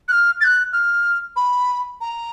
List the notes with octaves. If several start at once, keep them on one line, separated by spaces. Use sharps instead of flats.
F#6
F6
A6
F#6
F6
B5
A#5